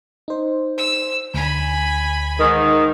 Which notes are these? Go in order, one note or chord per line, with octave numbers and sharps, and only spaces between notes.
D#4 C5
C5 E6
D2 G#5 B5
G#2 D#3